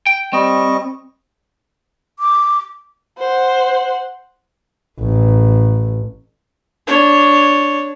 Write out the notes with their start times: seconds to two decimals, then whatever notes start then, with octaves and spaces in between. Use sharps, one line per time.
0.07 G5
0.33 G3 C4 D#5 C#6
2.19 D6
3.18 C5 F#5
5.00 A1
6.87 D4 C#5